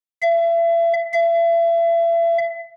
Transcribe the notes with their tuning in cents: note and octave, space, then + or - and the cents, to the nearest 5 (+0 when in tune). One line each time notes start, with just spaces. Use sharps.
E5 +35
E5 +35